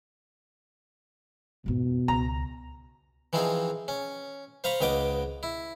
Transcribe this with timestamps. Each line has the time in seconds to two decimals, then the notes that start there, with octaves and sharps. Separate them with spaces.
1.66 F2 G#2 B2
2.08 C#2 A#5
3.33 E3 F3 C4 D#4 G#4
3.88 C#4
4.64 C5 F5 A#5 B5 C#6
4.81 C#2 B3 D#5 G5 D6
5.43 E4